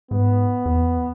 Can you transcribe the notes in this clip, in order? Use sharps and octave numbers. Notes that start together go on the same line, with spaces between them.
G#2 B3
E2